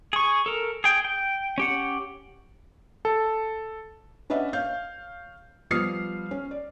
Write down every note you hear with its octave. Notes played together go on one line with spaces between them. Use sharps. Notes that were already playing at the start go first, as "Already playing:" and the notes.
G#4 C#6
A4 A#4
G#4 G5
G5
C#4 G4 F#5
A4
C#4 D4 B4 D#5 E5 F#5
C#5 F5 G6
F3 G3 B3 D#6 F6 C7
C#4
D5